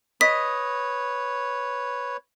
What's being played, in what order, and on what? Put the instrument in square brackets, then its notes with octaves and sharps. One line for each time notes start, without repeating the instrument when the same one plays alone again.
[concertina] B4 C#5 [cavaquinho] D#5 [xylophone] B6